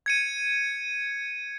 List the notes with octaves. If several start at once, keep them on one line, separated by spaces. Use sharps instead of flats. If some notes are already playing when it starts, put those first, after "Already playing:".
G#6 C#7 D#7